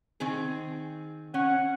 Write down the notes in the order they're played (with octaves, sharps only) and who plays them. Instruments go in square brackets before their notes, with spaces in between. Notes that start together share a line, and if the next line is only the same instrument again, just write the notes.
[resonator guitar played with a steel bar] D#3 C4 G#4
[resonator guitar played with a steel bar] C#4 [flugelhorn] F#5